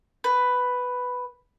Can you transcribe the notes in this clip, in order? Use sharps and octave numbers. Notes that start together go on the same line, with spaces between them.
B4